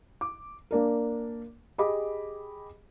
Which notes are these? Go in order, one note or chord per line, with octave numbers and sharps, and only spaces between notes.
D6
A#3 D4 A#4
G4 G#4 D#5 B5 D6